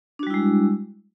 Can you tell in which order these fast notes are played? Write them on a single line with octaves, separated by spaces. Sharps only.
D4 F#4 G3 E4 G#3